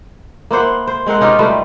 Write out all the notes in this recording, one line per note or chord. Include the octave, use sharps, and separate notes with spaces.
A#3 E4 C5 F#5
C5
G#3 C4 A#4 F#5
C#4 D#4 F4 G4
G3 A3 B4 C5